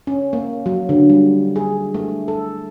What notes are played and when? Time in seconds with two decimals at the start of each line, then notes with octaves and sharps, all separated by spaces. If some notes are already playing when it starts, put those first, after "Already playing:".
0.07 C#4
0.33 A#3
0.66 F#3
0.89 D3
1.10 G3
1.56 G#4
1.94 A3
2.28 A4